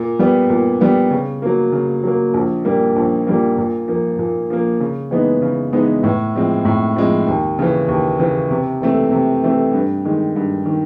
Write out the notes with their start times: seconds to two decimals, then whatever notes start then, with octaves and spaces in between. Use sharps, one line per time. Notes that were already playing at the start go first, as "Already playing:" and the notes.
Already playing: A#2
0.19 G3 B3
0.50 A#2
0.81 G3 B3
1.11 C#3
1.42 F#3 A#3
1.72 C#3
2.04 F#3 A#3
2.34 A#1
2.65 A#2 G3 A#3
2.96 A#1
3.27 A#2 G3 A#3
3.58 A#2
3.88 F3 A#3
4.19 A#2
4.50 F3 A#3
4.80 C#3
5.11 E3 G#3 B3 D#4
5.42 C#3
5.73 E3 G#3 B3 D#4
6.03 A2
6.35 F3 G#3 C4
6.65 A2
6.96 F3 G#3 C4
7.27 D#2
7.59 C#3 E3
7.88 D#2
8.19 C#3 E3
8.51 C3
8.82 E3 A3 C4
9.12 C3
9.44 E3 A3 C4
9.73 G2
10.05 D#3 G#3
10.36 G2
10.66 D#3